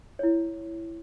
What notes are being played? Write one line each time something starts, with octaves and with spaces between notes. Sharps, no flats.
E4 C#5